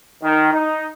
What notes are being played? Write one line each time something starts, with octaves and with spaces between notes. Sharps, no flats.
D#3
D#4